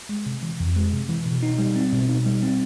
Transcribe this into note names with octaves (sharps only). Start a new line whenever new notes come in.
G#3
C3
E3
F2
G#3
C3
E3
B2
D#4
G3
C4
B2
D#4
G3
C4